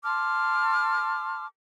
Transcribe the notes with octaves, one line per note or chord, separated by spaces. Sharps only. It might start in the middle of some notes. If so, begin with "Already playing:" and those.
A5 C6 D6 F6